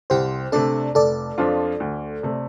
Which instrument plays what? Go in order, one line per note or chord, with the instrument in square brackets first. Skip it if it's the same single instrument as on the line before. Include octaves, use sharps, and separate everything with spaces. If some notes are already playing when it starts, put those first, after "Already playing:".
[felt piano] C2 [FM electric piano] G4 C5
[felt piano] C3 A3 D4 [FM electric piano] A4 D5
[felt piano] F1 [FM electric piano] A4 D5
[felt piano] F2 F3 D4 F4
D2
C3 A3